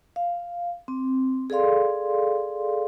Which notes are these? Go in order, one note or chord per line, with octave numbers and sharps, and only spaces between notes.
F5
C4
G#4 A4 D5 F5 C6